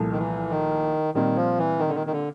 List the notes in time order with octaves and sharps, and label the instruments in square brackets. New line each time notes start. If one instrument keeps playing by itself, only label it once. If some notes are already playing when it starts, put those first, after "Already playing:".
Already playing: [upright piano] C2 A#2 F3 A3
[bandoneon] D#3
E3
D#3
[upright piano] A#2 G3 C4 [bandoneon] D#3
[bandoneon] F3
E3
D#3
D3
D#3
D#3
D3